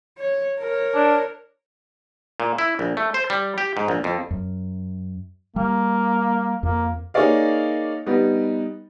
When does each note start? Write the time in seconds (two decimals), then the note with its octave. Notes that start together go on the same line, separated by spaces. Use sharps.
0.18 C#5
0.58 A#4 C#5
0.95 D4
2.40 A#2
2.58 E4
2.79 A#1
2.97 A3
3.14 C5
3.30 G3
3.58 G4
3.77 G#2
3.88 A#1
4.04 F2
4.31 F#2
5.56 G3 A#3
6.63 F2 A#3
7.14 A#3 D#4 G#4 C#5 D5 F5
8.06 G3 B3 D#4